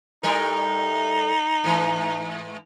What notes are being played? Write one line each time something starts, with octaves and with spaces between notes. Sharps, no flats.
A2 G3 D#4 A#4
G#2 E3